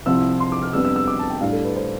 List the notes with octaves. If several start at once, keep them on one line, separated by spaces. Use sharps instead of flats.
C2 C3 F3 C4 E4 E6
C6
D6
F6
F2 C3 G3 B3 D4 E6
E6
E6
D6
A5
G5
A2 G3 D4 F5
A4
B4
C5